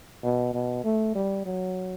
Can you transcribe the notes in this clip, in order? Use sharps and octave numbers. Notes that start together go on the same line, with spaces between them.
B2
B2
A3
G3
F#3